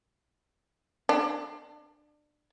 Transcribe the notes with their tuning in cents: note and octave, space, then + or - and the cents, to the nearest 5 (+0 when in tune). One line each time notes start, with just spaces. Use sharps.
D4 +25